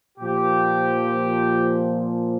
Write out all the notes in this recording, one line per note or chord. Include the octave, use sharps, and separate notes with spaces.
A#2 F3 G4